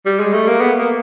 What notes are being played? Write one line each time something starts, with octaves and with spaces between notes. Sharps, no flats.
G3
G#3
A3
A#3
B3
A#3